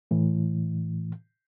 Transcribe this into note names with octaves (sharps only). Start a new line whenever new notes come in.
A2 E3